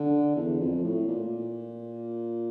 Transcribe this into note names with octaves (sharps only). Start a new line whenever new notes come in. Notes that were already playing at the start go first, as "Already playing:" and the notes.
Already playing: D3
E2
F2
A2
A#2